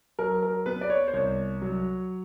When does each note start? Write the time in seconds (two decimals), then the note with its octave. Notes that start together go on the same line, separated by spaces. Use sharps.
0.19 F#3 A#4
0.42 A#4
0.66 B3 B4
0.81 D5
0.90 C#5
1.08 C5
1.14 C2 C#5
1.62 F#3